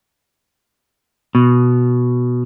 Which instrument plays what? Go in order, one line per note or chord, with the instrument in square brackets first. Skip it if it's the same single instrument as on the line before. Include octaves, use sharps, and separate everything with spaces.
[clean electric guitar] B2